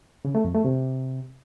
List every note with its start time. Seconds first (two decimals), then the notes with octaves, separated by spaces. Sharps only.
0.25 C#3
0.35 A3
0.45 F2
0.55 A3
0.65 C3